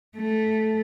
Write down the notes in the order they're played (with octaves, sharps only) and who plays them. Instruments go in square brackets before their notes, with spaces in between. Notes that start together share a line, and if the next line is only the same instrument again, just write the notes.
[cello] A3